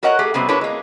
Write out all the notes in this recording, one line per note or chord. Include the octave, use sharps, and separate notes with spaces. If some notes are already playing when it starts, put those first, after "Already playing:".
F#4 A#4 C#5 D#5 F#5
A3 G4 G#4
C3 F#3 G3 B3 C4
D4 E4 G4 A#4 B4 C#5
G#3 A#3